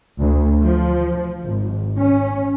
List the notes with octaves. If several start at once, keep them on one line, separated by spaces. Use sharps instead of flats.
D2
F3
G#1
C#4